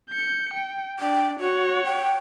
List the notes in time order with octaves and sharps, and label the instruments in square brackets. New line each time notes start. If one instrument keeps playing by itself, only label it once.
[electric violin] G6 C#7
G5
[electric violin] D4 D5 [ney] G5
[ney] F#4 [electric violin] C#5 F#5
[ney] G5